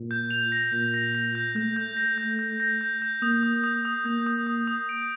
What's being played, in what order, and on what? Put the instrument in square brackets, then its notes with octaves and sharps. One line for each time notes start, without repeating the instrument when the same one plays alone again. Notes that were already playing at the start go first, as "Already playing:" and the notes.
Already playing: [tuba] A#2
[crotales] G6
F7
A#6
[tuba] A#2 [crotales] A#6
[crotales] A#6
A#6
G6
[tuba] A3 [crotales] G6
[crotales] G6
A#6
G6
G6
A#6
G6
G6
[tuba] A#3 [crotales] D#6
[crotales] D#6
D#6
D#6
[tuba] A#3 [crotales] G6
[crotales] D#6
D#6
D#6
D7